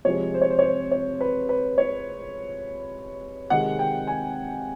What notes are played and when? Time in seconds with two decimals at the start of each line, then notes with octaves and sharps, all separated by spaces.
0.05 C3 F3 G#3 C#5
0.34 C5
0.41 C#5
0.50 C5
0.59 C#5
0.63 C5
0.91 C#5
1.21 B4
1.49 B4
1.78 C#5
3.50 C3 D#3 G#3 F#5
3.79 G5
4.07 G#5